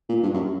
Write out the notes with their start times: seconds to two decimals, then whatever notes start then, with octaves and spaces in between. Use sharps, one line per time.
0.09 A#2
0.23 G2
0.33 F#2